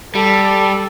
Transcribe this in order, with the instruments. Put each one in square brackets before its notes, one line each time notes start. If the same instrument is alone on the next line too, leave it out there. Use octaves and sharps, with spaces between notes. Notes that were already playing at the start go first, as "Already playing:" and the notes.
[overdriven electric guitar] G3 [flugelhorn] A4